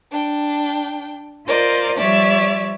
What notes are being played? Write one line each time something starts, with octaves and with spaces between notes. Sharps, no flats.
D4 G5
F4 A#4 C5 D5 D#5
F3 G3 C#5 D5 E5